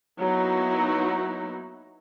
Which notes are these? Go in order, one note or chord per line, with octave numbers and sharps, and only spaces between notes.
F#3 A#3 B3 D#4 E4 F#4